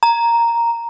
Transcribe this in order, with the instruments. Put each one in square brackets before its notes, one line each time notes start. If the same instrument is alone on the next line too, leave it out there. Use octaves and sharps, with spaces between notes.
[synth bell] A#5